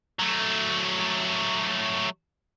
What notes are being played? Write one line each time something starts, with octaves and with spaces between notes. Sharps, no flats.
F#3 A3